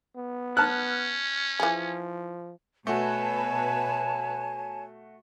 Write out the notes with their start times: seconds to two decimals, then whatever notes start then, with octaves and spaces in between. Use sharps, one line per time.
0.16 B3
0.57 C#4 A5 F6 F#6
1.60 E3 F3 G#4
2.87 B2 A3 F#4 B4 C#5 G#5 A5